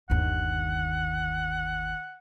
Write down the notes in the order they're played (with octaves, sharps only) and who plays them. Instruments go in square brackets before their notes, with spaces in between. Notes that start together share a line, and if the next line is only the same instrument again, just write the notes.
[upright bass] G1 D#2 [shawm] F#5